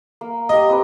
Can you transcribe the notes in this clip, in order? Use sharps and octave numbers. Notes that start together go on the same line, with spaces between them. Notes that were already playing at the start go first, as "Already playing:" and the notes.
A#3
G4 A#4 D#5
C4 G4 B4